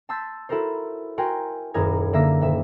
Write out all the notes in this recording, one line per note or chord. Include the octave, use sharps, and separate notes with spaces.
A5 C6 E6 G6 A6 B6
E4 F#4 A4 A#4 C5
F#4 A#4 G5 G#5 C6
D#1 F#2 E4 G#4 A#4 G#6
D3 A#3 E5 E6 A#6
D#1 E5 E7